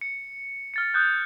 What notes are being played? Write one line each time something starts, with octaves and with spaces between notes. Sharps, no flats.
C#7
F6 A6 C#7
D#6 F#6 G6